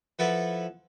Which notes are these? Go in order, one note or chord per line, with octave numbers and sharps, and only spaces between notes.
F3 E4 A4 B4 F#5